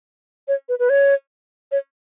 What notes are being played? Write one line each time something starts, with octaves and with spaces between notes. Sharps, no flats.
C#5
B4
B4
C#5
C#5